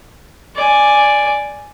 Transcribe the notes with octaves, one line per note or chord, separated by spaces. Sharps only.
D5 G#5